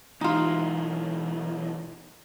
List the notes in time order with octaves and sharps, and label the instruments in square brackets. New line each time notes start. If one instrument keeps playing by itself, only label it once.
[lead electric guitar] B1 E3 [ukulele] D#4 F4